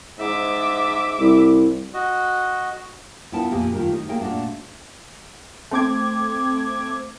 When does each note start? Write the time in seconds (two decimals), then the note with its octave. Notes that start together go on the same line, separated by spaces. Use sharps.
0.20 G#2 E5 D6
1.19 C2
1.94 F#4 D#5
3.32 B3 E4 F4 A#4 G5 A5
3.51 F2 A#2 A#3 G4 G#4
3.72 D#3 A3 F4 G4 A#4
3.92 D#4
4.08 A3 A#3 G#4 A#4 D#5 G5
4.20 A#2 G#3 A3 D4 F#4
5.71 A3 C4 D6 G#6